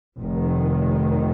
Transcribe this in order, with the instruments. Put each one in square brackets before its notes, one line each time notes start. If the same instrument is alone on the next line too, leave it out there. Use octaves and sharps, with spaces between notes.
[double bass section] F1 F2 D#3